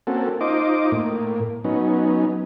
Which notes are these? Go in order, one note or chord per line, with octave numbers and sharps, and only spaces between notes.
A#3 C4 C#4 F#4 A4
D#4 F4 C5 D#5 D6
A2 A#3
F#3 B3 C#4 D#4